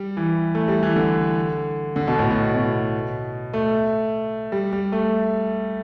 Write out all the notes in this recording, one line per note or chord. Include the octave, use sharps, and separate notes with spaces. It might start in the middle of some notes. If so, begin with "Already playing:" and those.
Already playing: G3
E3
A3
G3
E3
D3
D3
B2
A2
B2
B2
A3
G3
G3
A3